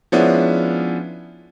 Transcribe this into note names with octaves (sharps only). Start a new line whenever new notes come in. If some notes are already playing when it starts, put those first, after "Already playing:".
F3 G#3 B3 C#4 D4 E4